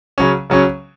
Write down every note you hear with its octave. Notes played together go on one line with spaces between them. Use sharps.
C#3 F#3 C#4
C#3 F#3 C#4